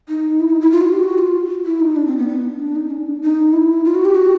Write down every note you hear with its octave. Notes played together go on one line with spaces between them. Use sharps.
D#4
E4
D#4
E4
F4
F#4
G4
F#4
F4
E4
D#4
D4
C4
B3
B3
D4
D#4
C#4
D4
D#4
E4
F4
F#4
G4
F#4